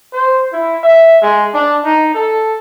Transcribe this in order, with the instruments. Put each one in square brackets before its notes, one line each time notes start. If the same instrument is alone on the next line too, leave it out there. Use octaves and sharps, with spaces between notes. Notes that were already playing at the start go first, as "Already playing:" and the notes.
[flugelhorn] C5
E4
E5
G#3
D4
D#4
A4